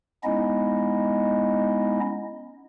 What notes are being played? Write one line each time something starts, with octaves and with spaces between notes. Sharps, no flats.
G#3 B3 C#4 D#4 E4 D#5